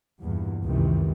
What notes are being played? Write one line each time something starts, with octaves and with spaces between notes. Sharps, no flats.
E2 G2 A#2
C#2 F#2 C3 D#3 E3